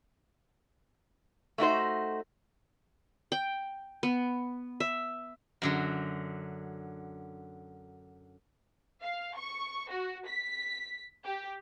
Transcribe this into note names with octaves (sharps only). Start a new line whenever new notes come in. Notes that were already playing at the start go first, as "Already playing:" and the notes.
A3 D#4 F#4 C5
G5
B3
E5
F#2 D3 F#3
F5
C#6
F#4
B6
G4